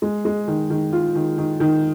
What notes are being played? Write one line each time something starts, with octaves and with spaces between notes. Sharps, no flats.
G#3
G#3
D#3
D#3
F4
D#3
D#3
D#3